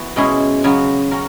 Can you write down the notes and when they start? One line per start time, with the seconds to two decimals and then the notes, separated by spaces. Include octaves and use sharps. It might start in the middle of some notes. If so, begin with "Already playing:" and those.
Already playing: E3 B3 F#4
0.16 B2 G#3 C#4 E4 G#4
0.64 C#3 F#3 B3 F#4
1.11 C#4 F#4 A#4